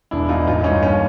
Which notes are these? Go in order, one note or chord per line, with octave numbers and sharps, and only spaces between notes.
E1 D4 E4
E2 D#4 F4
A1 D#4 F4
G2 C#4 D#4
D#2 C#4